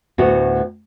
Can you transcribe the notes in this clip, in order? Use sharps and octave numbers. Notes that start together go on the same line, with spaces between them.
D2 A2 B3 F#4